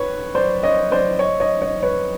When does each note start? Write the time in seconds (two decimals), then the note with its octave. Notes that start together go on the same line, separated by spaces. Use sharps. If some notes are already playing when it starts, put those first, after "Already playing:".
Already playing: B4 C#5
0.35 C5 D5
0.63 C#5 D#5
0.92 C5 D5
1.19 C#5 D#5
1.40 C#5 D#5
1.62 C#5 D#5
1.83 B4 C#5